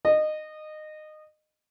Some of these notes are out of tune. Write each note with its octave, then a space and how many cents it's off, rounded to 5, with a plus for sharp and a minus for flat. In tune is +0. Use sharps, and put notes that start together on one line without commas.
D#5 -20